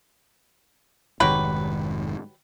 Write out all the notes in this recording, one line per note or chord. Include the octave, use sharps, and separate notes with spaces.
F1 G#2 D#3 F#3 G4 B4